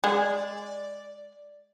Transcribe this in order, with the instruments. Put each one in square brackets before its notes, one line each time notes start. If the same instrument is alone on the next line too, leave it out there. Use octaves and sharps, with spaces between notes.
[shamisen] G#3 [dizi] D5